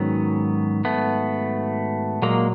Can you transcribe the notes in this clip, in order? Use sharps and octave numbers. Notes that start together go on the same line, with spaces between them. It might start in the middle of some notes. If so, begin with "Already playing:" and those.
Already playing: G#2 D#3 F#3 B3 C#4
A3 B3
A#2 F#3 G#3 A#3